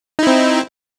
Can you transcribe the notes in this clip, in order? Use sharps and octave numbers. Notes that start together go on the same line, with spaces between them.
C4 D#4 E4